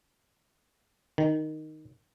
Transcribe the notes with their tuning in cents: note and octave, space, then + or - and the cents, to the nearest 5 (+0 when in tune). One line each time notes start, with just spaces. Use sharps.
D#3 -5